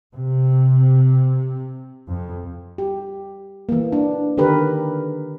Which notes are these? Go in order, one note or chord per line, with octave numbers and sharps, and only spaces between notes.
C3
F2
G4
E3 A#3
D4
D3 D#3 G4 A#4 B4